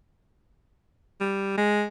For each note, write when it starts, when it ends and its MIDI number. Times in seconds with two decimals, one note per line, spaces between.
1.21 1.57 55
1.58 1.84 56